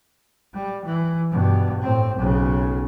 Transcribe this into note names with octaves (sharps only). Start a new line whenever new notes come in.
G3
E3
G2 B2
A2 C4
B1 C#3